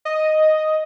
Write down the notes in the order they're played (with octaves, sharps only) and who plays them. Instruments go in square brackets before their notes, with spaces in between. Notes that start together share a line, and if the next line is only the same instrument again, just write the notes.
[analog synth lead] D#5